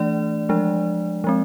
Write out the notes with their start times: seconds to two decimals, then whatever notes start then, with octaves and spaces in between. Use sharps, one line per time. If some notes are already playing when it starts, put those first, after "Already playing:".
Already playing: E3 A3 D4 D5
0.49 F3 G#3 D4
1.24 F3 G#3 C4